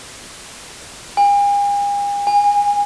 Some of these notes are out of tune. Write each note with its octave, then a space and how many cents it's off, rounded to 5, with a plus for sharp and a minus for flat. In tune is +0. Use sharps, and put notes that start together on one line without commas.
G#5 -45
G#5 -25